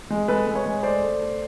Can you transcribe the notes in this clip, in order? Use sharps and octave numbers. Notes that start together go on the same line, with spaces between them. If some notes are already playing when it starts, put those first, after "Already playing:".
G#3
G#3 A4 B4
G#3
B4 C#5
G#3
A3 C5 D5
A3
A3